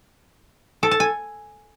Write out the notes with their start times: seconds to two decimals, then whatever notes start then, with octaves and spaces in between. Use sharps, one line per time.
0.83 A4
0.91 A5
1.00 G#5